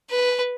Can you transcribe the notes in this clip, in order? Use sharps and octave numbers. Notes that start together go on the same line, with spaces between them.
B4